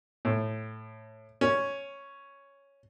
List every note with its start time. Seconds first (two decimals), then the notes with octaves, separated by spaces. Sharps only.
0.25 A2
1.41 C#4